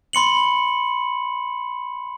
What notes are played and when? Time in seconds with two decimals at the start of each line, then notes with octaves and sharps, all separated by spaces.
0.13 B5 C6 C#7 F#7